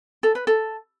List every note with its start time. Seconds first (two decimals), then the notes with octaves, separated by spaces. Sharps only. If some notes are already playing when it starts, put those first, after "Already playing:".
0.23 A4
0.35 B4
0.47 A4